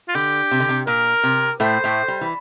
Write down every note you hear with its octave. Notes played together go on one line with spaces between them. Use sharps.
F4
D3 G4
C3
D3
C3
A#2 A#4
C3
A2 A3 C5
A2 A3
G3
E3